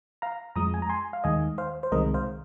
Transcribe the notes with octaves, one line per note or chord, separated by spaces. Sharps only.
F5 A#5
F2 F3 G#3 A#5 D#6
G#5
A#5
G#5 C6
F5
D#2 D#3 G#3 D#5 G#5
C5 F5
C5
C2 C3 D#3 G#3 A#4 D#5
C5 F5